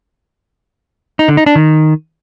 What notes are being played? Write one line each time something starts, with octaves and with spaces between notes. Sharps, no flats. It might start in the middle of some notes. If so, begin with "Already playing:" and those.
D#4
D3
D#4
D4
D#3